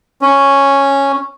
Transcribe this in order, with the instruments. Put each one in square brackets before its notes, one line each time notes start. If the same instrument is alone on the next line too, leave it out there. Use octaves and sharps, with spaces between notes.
[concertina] C#4